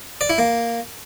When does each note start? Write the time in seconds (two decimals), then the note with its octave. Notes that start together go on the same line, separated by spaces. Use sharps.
0.21 D5
0.30 E4
0.38 A#3